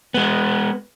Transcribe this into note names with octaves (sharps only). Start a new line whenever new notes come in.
G#3 B3